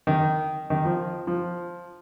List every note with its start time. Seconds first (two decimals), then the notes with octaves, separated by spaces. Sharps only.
0.07 D#3
0.70 D#3
0.85 F3
1.27 F3